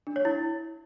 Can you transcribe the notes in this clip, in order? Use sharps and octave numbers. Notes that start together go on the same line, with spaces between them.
D4
C#5
E4